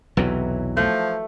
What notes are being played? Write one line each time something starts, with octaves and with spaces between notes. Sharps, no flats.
B1 E2 C3 E3 F#3
F3 A3